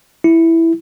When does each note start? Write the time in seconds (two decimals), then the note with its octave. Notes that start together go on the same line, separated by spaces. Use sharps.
0.24 E4